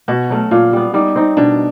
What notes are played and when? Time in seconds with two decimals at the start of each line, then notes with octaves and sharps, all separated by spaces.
0.08 B2 F#4
0.30 F#3 A3 C#4
0.51 A#2 F4
0.73 G3 B3
0.94 G3 D#4
1.16 C4 D#4
1.37 B2 D4